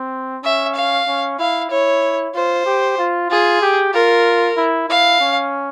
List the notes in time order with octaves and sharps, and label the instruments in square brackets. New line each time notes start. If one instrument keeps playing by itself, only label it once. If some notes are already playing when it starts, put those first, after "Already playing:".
Already playing: [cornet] C4
[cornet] C#4 [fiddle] E5
[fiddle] F5
[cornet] C#4
[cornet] E4 [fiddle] F5
[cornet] E4 [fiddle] C#5
[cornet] F4 [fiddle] C5
[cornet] G4
F4
[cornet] F4 [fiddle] G#4
[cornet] G4
[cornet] F4 [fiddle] A#4
[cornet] E4
[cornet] E4 [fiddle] F5
[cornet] C#4